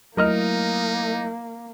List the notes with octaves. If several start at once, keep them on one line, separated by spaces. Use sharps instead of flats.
F#3 A3 A#3 D#4 E4 A#4 D#5 F6